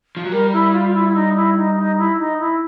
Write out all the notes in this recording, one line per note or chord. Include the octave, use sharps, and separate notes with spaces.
F3
F#3
G3 A#4
E4
F4
F4
E4
E4
D#4
E4
D#4
D#4
E4
D#4
E4